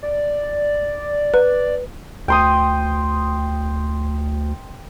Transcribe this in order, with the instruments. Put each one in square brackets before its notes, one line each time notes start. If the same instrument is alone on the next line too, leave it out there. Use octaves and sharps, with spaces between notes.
[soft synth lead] D5
[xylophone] B4
[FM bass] D2 [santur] G5 C6 D#6